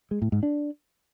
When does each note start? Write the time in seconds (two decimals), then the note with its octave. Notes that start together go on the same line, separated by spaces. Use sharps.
0.11 G#3
0.22 A2
0.32 G#2
0.43 D4